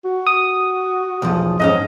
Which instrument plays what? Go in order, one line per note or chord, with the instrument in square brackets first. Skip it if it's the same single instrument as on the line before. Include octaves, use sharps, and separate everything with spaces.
[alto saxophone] F#4
[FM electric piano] D#6
[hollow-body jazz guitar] B1 E2 F3
[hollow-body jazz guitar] F2 G#2 C#4 [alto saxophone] D#5